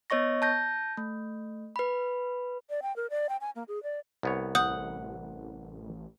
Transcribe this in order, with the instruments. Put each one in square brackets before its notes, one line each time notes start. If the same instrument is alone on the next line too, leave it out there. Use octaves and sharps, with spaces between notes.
[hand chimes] B3 C#5 D#5 C#6 A#6
A5 G6 A#6
A3
B4 B5
[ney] D5
G5
A#4
D5
G5
G#5
A#3
G#4
D5
[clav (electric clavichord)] C2 B3 C#5
[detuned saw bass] A1 [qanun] F#5 [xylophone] D#6 G6